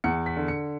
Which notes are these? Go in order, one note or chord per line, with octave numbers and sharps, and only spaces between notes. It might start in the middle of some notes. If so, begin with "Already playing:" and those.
E2 C#7
B6
D3
C#7